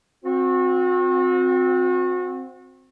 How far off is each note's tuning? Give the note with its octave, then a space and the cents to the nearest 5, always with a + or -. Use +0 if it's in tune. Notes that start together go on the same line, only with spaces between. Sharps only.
C4 +0 F#4 -35